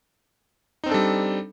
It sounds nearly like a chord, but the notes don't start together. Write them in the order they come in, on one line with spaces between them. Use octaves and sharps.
D#4 C4 D4 A4 G3